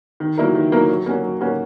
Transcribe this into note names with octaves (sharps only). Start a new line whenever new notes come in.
D#3
F#3 A#3 E4 A#4
D#3
F#3 A#3 E4 A#4
F#3
A#3 C#4 F#4
F#3
A#3 C#4 F#4